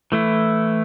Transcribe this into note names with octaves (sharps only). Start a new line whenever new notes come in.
E3 A3 E4